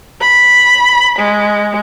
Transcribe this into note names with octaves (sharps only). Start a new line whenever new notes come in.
B5
G#3